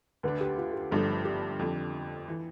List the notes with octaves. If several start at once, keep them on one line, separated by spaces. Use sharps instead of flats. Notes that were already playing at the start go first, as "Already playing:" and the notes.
D2 D3 A3 D4 B4
G4
F4
G4
G1 G2 F3 A3 A4
G4
F2 D3 F3
E3